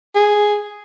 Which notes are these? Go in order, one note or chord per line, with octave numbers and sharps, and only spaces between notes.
G#4